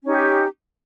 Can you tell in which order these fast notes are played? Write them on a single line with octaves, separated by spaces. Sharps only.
C#4 D#4 G4